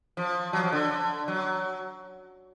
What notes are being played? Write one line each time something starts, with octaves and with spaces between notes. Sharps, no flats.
F3
F#3
F3
D3
F#3